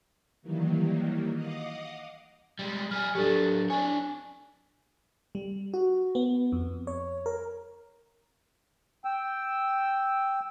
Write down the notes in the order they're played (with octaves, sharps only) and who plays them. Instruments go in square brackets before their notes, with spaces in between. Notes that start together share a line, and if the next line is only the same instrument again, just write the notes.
[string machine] D#3 E3 F#3 G3 A#3
D#5 F5 F#5 D6 D#6
[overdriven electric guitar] G3 G#3
[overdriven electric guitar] G3 G#4 [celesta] F6
[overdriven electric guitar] F#3 D4 [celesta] G4 A4
[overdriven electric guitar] D4 C#5 [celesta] G#5
[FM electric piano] G3
F#4
B3
F2
C#5
A#4
[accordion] G5 E6